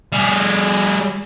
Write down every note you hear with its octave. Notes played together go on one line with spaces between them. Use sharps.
G3 G#4